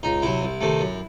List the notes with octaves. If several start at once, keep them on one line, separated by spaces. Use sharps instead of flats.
C#2 D#4
C3 F#3 E4
C2
C3 D#3 A3
F#2